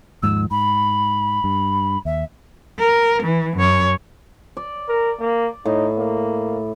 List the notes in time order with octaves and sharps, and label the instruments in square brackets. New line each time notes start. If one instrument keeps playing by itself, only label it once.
[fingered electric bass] D#2 G#2 F3 [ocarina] E6
[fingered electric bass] G#2 [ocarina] B5
[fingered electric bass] G2
[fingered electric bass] D#2 [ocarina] E5
[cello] A#4
E3
F#2 C#5
[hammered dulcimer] D5
[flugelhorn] A#4
A#3
[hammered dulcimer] A2 [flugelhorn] D#4
[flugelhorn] A#3